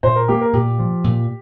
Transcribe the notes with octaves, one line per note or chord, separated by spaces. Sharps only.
A#2 C5
A#4
A#3 G4
A#4
A#2 G4
F3
A#2